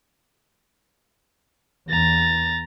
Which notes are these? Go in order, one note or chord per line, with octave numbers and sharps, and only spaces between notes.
E2 A#5 A6